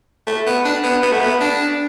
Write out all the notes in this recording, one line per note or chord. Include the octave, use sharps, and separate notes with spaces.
A3
B3
D4
B3
B3
A3
B3
D4